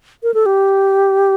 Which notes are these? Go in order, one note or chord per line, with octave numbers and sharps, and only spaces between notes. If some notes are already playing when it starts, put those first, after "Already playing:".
A#4
A4
G4